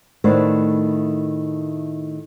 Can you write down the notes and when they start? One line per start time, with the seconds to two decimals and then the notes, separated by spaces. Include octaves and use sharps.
0.24 A2 D#3 A3 B3 D4 C5